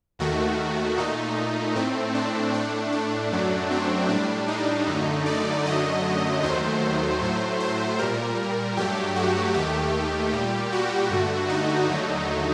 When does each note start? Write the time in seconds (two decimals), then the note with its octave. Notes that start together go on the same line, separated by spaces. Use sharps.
0.19 D#2 D#3 A3 F#4
0.98 A#2 A3 D#4
1.75 A2 A3 C4
2.15 D4
2.54 A2 A3 D4
2.92 D4
3.32 F#2 F#3 A3
3.71 C4
4.09 A2 G3 D4
4.48 D#4
4.87 F#2 D3 A3
5.26 D5
5.66 F#2 D3 F#3 A3 D#5
6.43 D#2 D#3 F#3 A3 C5
7.21 A2 F#3 A3
7.60 C5
7.98 A#2 G3 A#4
8.77 G2 F#3 A3 G4
9.16 F#4
9.54 D#2 D#3 A3 G4
10.32 A#2 G3
10.72 F#4
11.10 G2 D3 A3
11.49 D#4
11.88 D#2 D3 F#3 A3